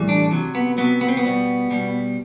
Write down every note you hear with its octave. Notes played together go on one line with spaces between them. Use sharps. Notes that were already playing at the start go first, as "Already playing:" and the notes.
Already playing: A2 E3 G3
D4
C3 F#3
B3
C3 F#3 B3
B3
C4
B3
B2 G3
B2 G3